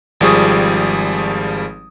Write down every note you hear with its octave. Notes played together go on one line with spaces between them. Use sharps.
G#1 F3 G3 G#4 C#6 D#6